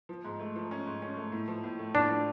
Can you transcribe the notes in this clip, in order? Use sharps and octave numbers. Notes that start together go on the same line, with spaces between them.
F3
G#2
A3
F3
C#4
G#2
C#4
A3
A2
F3
A2
A3
A2 D4
F3